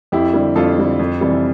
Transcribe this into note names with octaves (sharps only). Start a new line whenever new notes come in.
F2 E4 G4
D3 G3
F2 F4 A4
D3 G3
F2
C3 E3 G3